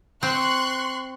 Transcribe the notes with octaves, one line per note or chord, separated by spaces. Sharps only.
C4 C6 C#6 F#6